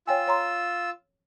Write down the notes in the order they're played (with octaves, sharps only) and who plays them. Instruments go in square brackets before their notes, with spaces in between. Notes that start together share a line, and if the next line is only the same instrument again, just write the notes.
[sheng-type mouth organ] F4 E6 [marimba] C#5 G5 G#5
[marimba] C#5 A#5 C6